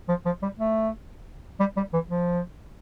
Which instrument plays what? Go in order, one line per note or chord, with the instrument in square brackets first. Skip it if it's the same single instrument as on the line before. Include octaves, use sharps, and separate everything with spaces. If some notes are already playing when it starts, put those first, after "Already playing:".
[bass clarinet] F3
F3
G3
A3
G3
G3
E3
F3